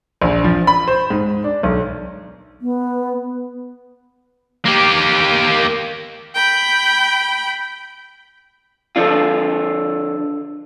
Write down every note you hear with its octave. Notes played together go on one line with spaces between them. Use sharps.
A#1
F3
B5
C5
G#2
D4
B1
B3
A#3 G4
G5 B5
D3 F3 D4 F4